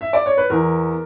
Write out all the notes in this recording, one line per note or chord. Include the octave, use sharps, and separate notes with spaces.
E5
D5
C#5
B4
E2 A#4